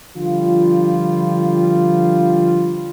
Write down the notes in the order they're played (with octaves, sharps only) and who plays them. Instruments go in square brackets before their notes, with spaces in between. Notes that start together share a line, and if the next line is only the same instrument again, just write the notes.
[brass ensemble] D3 F3 G3 F4